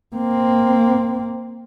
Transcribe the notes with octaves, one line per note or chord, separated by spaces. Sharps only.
A#3 C4